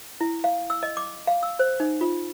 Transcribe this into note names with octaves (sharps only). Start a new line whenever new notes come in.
E4
F5
E6
D#5
D6
F5
E6
C5
D#4
F4